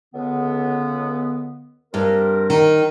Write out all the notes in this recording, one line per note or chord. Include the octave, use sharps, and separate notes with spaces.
C#2 D3 B3
G2 C4 G4 A#4
D#3